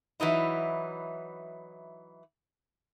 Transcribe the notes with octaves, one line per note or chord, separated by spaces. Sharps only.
E3 F#3 D#4 E4